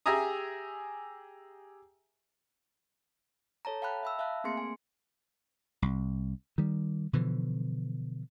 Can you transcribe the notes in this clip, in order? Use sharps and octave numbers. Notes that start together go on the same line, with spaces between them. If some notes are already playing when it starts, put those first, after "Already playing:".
G4 G#4 E5 G#5 A#5 D#6
A4 C#5 A5 A#5
F5 G5 A5 B5 F#6
E5 B5 E6
E5 F5 A5 F#6
A3 A#3 C4 G#4 C6 C#7
G#5
C2
D#3 G3
B2 D3 E3 F3